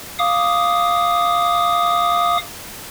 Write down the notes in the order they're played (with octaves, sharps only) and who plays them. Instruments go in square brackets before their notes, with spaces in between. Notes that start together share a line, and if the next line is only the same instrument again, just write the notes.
[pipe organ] F5 D6 D#6